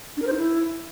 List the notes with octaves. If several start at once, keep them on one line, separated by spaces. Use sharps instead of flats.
D4
A#4
C5
D#4
E4